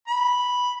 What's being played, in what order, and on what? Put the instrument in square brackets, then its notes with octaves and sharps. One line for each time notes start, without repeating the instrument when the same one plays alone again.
[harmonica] B5